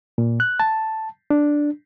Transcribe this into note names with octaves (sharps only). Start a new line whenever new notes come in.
A#2
F#6
A5
D4